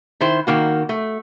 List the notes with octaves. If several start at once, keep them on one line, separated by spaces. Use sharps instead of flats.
D#3 E4 C5
D#3 A#3 F#4
A3